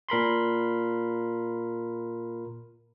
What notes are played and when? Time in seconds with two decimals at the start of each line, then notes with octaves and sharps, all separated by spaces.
0.09 A#2 A#4 B5 C6